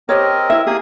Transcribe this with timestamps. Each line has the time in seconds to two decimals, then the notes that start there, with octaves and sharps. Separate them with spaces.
0.09 C4 G4 A#4 C5 C#5 D#5
0.50 E4 E5
0.67 A#3 E4 G4 G#4 D#6